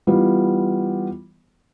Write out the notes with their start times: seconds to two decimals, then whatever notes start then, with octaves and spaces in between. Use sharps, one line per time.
0.07 E3 G3 B3 F4